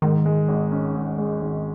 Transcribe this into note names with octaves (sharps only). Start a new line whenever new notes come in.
G#2 D#3
G#3
G#1
C#4
G#2
G#3
G#1